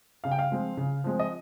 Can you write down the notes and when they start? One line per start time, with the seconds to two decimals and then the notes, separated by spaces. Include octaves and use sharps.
0.24 C#3 F5
0.32 G5
0.39 F5
0.51 F3 G#3 C4
0.77 C#3
1.04 F3 G#3 C4
1.19 D#5